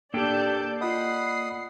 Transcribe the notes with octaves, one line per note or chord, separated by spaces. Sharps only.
A#3 D4 G4 A4 D5 G5 A5 G6
F4 D5 D#5 F#5 B5 D#6 C7